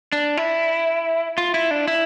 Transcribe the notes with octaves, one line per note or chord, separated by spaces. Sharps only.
D4
E4
F4
E4
D4
E4